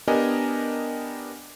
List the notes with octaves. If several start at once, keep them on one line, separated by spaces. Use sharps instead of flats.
B3 D4 G4 A#4 D#5 G#5